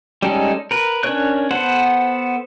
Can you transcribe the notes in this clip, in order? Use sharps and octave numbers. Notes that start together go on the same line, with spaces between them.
G3 G#3 C#4 D#4 A4
A#4 B4
C#4 D4 A#4 C#5 F#6
B3 A4 C5 F#5